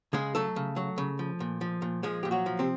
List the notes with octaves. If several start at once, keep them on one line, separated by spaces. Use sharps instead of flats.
C#3 G#3 G#4
F#3 A3 A4
C#3
F#3
C#3
F3
A#2
F3
A#2
F3 G#3 G#4
A#2 G4
F#3 F#4
F3
C3 C4